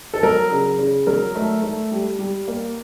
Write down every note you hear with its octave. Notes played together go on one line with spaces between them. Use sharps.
A4
F#3 A#4
C#3
C#3
F#3 A#4
A3
A3
G3
G3
A#3